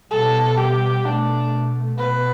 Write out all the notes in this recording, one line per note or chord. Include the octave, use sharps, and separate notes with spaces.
B2 G3 B3 A4
G4
B2 A3 D4
B2 B3 B4